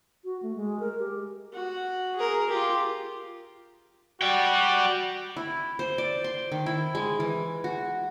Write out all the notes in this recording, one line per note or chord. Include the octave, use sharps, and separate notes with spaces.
F#4
A3
G#3
A#4
G4
F#4
G#4 A#4
F4 G4
F#4 D5 G5
E4
C5
D5
C6
D#3
E4
G#3
E3
F#4